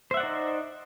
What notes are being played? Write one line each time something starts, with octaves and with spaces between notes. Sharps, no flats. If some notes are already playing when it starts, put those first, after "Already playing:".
D#4 C5 D5 E5 F#5